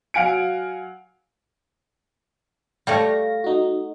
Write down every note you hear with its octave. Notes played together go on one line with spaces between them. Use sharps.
F#3 F5 F#5 G#5 D7
G3 A3 C#5 F5 A#6
D#4 F#4